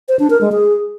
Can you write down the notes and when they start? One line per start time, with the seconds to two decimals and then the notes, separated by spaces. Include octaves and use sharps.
0.08 C5
0.19 D4
0.30 A#4
0.41 G#3
0.52 G#4